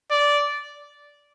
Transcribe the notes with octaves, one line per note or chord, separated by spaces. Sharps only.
D5